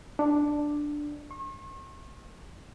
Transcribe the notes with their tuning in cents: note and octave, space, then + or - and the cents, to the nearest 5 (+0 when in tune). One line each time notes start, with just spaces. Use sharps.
D4 +5
C#6 -45